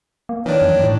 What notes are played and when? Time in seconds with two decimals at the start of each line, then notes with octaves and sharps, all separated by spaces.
0.29 A#3
0.46 D#3 E3 D4 C#5
0.62 F#2
0.84 A2